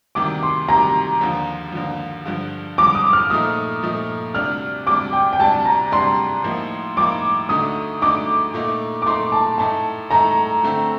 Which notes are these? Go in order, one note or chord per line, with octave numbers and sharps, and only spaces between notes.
D2 C3 D#3 G3 D6
C6
D2 C3 D#3 G3 A#5
D#2 D3 F3
D#2 D3 F3
G2 D3 F3
G2 D3 F3 D6
D#6
F6
A#2 F3 A3 D#4 D#6
A#2 F3 A3 D#4
D2 C3 G3 D4 F6
D2 C3 G3 D4 D6
G5
G5
D2 C3 G3 D4 A5
A#5
D2 C3 G3 D4 C6
A2 F3 A#3 D#4
A2 F3 A#3 D#4 D6
D2 D3 A3 D#4 D#6
D2 D3 A3 D#4 D6
A#2 A3 D#4
D6
A#2 A3 D#4 C6
A5
A2 A3 D#4 A5
A2 A3 D#4 A#5
D3 A3 C4